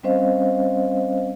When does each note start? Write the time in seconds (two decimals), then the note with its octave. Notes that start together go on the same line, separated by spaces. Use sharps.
0.03 G3 C4 C#4 C5 D#5 F5